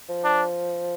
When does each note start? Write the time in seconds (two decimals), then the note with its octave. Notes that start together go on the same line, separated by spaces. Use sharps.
0.09 F3
0.24 D4